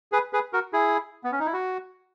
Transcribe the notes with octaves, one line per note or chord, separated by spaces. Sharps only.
G#4 B4
G#4 B4
F#4 A#4
E4 G#4
B3
C#4
D#4
E4
F#4